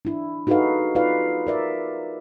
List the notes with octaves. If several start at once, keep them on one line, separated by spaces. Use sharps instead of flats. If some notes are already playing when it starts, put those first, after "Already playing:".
D4 E4
D#4 F#4 G#4 A4 B4 F5
D#4 F4 G#4 B4 D5 F5
A#4 D5 E5